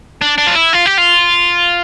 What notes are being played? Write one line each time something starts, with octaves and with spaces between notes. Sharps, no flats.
D4
D4
F4
E4
F4
G4
F4